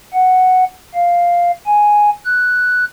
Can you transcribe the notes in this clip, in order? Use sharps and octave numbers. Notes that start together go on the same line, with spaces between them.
F#5
F5
G#5
F#6